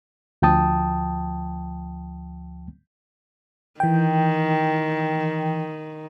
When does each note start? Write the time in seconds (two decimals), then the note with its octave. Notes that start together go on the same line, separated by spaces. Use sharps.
0.42 D2 F3 G5 A5 D#6
3.80 D#3 E3 G5